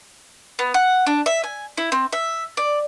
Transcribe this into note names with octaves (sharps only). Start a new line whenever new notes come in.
B3
F#5
D4
E5
G#5
E4
C4
E5
D5